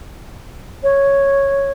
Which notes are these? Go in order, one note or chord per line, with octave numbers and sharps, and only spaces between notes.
C#5